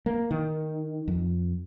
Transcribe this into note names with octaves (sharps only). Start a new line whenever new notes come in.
A#3
D#3
F2